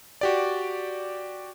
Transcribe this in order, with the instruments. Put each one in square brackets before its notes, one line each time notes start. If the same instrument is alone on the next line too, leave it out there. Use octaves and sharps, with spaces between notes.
[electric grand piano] F#4 G4 D5